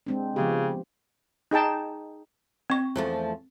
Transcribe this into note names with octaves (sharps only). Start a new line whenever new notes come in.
G#3 C4 D4
C#3 F3 B3 G4
D#4 G#4 G5 A5
C4 C#6
E2 F3 A3